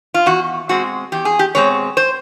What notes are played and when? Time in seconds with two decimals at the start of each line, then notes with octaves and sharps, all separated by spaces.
0.14 F4
0.26 E2 F#4
0.69 B2 G#3 C4 F#4
1.12 E2 G4
1.25 G#4
1.39 G4
1.55 B2 G#3 C4 C#5
1.97 C5